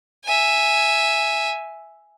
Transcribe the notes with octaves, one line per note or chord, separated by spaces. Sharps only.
E5 G#5